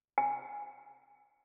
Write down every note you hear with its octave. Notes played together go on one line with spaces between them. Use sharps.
G#5